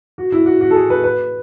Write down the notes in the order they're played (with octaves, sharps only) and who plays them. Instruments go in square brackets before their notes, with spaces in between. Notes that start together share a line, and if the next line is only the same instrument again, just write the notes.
[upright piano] F#4
E4
F#4
F#4
A4
G#4
B4
B4